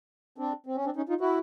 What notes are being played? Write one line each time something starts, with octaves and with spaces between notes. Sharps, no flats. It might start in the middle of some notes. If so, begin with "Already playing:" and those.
C4 D4
C4
C#4
C4 D4
C#4 D#4
D#4 F4
E4 F#4